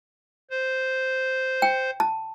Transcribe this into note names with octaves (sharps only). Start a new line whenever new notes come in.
C5
G5
A5